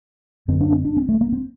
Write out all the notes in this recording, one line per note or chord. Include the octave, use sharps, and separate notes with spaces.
F#2 D3 C4
D4
C4
D4
C4
A3
A#3
C4